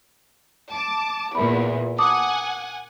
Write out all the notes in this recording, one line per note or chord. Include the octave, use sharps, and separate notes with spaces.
A5 D6
E2 A#2 A#4 B5
F#5 G#5 A5 D6 D#6